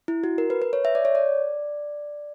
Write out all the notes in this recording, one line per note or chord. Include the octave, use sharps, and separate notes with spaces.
E4
F#4
A#4
B4
B4
C#5
E5
D5
C#5
D5